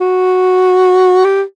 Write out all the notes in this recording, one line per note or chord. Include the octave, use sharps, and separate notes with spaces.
F#4
G4